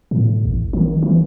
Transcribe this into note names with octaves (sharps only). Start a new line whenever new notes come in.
A2
A1
D#3
E3